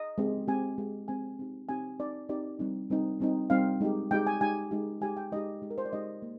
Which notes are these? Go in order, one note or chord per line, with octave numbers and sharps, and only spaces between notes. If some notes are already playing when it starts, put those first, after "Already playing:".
Already playing: D#5
G#3 C4 G4
G#3 C4 G4 G#5
G#3 C4 G4
G#3 C4 G4 G#5
C4 D#4 G4
C4 D#4 G4 G#5
C4 D#4 G4 D5
C4 D#4 G4 D5
G3 C4 D#4
G3 C4 D#4
G3 C4 D#4
G3 C4 D#4 F5
G#3 D#4 G4
G#3 D#4 G4 G5
G#5
G#3 D#4 G4 G#5
G#3 D#4 G4
G#3 D#4 G4 G#5
G5
G#3 D#4 G4 D#5
G#3 D#4 G4
A#4
C5
D5
G#3 D#4 G4 D#5
A#3